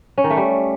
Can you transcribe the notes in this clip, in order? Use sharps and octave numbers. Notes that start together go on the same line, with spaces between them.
C#4
D#3
A3
G3